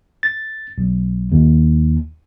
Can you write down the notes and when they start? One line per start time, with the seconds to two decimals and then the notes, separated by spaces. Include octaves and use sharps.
0.23 A6
0.78 B1
1.32 D#2